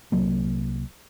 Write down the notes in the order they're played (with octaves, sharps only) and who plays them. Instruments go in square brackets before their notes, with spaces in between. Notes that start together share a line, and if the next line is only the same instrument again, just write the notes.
[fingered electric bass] C2 F#3 A#3